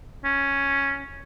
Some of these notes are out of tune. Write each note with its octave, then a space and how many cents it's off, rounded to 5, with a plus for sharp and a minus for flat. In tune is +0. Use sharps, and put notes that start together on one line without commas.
C#4 +0